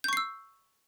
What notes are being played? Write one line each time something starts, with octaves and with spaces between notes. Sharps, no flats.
C#6 E6 G6 C7